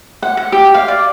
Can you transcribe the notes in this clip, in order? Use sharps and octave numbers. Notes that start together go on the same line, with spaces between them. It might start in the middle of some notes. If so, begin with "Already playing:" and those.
F#5
F#5
G4
F5
D5